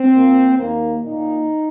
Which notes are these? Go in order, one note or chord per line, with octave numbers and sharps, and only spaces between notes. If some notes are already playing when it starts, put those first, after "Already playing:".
Already playing: C4
A#2 A#3
D#2 D#3 A#3
A#2 A#3 D#4